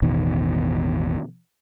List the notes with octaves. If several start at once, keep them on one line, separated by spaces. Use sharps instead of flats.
A1 E2 B2 D#3